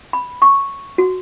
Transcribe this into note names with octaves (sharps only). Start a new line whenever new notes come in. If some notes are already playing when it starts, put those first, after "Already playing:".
B5
C#6
F#4